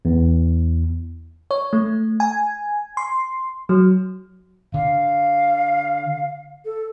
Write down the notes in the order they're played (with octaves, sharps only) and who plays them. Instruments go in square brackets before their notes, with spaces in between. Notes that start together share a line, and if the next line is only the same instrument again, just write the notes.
[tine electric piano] E2
[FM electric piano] C#5
A3
G#5
C6
F#3
[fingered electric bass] D3 [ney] F5
[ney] A4